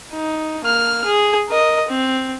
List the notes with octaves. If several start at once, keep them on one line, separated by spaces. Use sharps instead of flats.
D#4
A#3 F6
G#4
A#4 D#5
C4